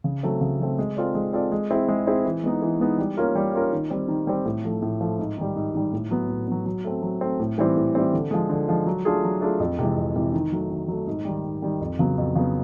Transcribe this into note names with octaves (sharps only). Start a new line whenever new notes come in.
C#3
F#3 A3 C4
C#3
F#3 A3 C4
G#3
C4 F4 A4 D5
G#3
C4 F4 A4 D5
G#3
C4 E4 G#4
G#3
C4 E4 G#4
E3
G#3 B3 D#4
E3
G#3 B3 D#4
G3
A#3 C#4 F4 A#4
G3
A#3 C#4 F4 A#4
D#3
G3 C4
D#3
G3 C4
A2
F3 A3
A2
F3 A3
G#2
D#3 G3
G#2
D#3 G3
A2
F#3 B3
A2
F#3 B3
F#3
A3 C4
F#3
A3 C4
A2
E3 G3 C4
A2
E3 G3 C4
D3
F3 G#3
D3
F3 G#3
F#3
A3 D4 F4 G#4
F#3
A3 D4 F4 G#4
F2
C3 E3 G#3
F2
C3 E3 G#3
D#3
F#3 A3
D#3
F#3 A3
G#2
D#3 G3
G#2
D#3 G3
F2
C#3 F#3 B3
F2
C#3 F#3 B3